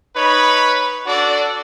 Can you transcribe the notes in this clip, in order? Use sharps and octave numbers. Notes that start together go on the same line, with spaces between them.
D#4 B4 C#5 B5
D4 F#4 A4 D5